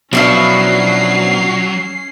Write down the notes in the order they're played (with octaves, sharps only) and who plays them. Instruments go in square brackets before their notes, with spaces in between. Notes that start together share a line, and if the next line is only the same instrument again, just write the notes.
[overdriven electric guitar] B2 [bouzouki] F3 D4 E4 [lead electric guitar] F#3 [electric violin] C#4 C7